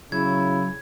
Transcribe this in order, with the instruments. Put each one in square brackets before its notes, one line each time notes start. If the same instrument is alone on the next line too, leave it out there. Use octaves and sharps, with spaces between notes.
[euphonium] C#3 [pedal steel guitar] F#3 [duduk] E4 [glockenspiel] G#6